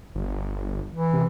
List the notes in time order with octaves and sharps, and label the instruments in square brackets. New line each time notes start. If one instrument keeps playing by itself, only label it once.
[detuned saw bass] G1
[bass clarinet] E3
[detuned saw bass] C3